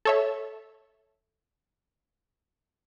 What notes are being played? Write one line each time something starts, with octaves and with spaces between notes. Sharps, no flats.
A4 C#5 E5